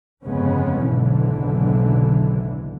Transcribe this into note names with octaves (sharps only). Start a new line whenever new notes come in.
G1 F2 C#3 G#3 B3 C#4
F#1 B1 G#2 B2 D3 E3